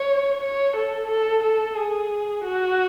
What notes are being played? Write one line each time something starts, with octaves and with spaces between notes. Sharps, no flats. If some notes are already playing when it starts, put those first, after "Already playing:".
Already playing: C#5
C#5
A4
A4
A4
G#4
F#4